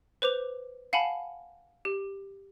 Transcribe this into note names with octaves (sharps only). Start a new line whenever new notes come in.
B4 C5 D6 F7
F5 F#5 G#5 A5 B5
G4